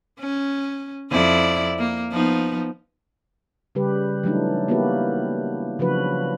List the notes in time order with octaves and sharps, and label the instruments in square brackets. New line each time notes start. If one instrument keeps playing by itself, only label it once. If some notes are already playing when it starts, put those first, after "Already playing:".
[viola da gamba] C#4
F2 E4 D5
A#3
F3 B3 D#4
[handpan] C#3 G3 G4 B4
E3 F#3 G3 A3 D4 D#4
A#3 B3 E4 F#4 G4 B4
C#3 F3 F#3 D4 F#4 B4